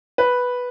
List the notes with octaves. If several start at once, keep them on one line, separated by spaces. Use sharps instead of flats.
B4